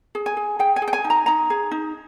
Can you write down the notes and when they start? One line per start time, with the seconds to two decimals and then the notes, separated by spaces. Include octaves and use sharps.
0.15 G#4
0.26 G#5
0.37 G#4
0.59 G#4 G5
0.76 G#5
0.82 G#4
0.88 G5
0.93 G#5
1.04 D#4
1.10 A#5
1.26 D#4 A#5
1.50 G#4
1.71 D#4